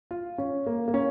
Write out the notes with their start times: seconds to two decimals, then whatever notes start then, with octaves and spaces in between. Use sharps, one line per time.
0.11 F4
0.38 C#4
0.66 A#3
0.88 A#3
0.94 C#4